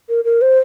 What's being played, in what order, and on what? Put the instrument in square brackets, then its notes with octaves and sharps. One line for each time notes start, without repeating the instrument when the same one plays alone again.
[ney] A#4
A#4
C5